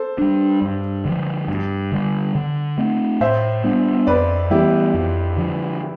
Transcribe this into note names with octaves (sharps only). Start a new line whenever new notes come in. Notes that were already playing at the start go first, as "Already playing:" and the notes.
Already playing: A4 C5
G3 D4
G2
D3 F3
G2
D3 G3
D3
A3 C4
A2 C5 E5
G3 B3 D4
F2 B4 D5
E3 G3 B3 E4 G4
F2
D3 F3